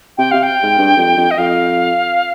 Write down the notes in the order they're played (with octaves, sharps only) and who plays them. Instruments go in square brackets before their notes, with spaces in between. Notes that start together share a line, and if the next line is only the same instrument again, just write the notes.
[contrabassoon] C3 [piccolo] G5
[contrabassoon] C3 [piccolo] F5
[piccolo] G5
[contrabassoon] G#2
G2
F2
F2
[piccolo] D#5
[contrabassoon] F2 [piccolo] F5